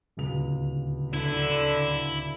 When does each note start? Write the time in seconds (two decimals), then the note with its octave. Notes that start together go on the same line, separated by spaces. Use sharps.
0.17 D1 C#2 F7
1.14 D3 E4